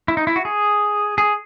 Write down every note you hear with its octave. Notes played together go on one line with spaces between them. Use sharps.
E4
D#4
E4
F#4
G#4
G#4